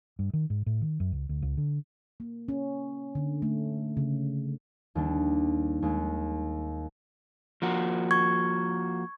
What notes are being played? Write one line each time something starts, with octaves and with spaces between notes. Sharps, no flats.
G2
D#3
G#2
A2
D#3
F#2
C#2
D2
C#2
D3
A#3
C#4
D3
A3
C#3
D#2 G3 D4
D#2 G#3
F3 A#3 F#4
C#6 G#6